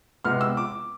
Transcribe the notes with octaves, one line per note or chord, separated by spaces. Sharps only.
C3 G#3 B3 F6
E6
D6